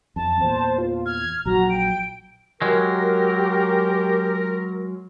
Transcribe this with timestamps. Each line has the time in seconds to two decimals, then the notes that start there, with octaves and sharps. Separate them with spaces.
0.16 F2 A5
0.40 E2 A#2 C5
0.78 F4
1.06 F6 G#6
1.46 A#1 F#3 F#4 A#5
1.70 G5 D7
2.62 F#3 G#3 G4 A#4